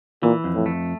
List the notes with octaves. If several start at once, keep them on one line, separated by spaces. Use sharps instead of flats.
A#2 E3
F2
A2
A3